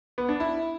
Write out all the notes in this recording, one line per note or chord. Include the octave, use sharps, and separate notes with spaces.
B3
D4
E4